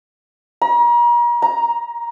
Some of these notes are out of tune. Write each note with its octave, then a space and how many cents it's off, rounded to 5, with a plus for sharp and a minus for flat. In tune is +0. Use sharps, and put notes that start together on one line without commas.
A#5 +40
A#5 +10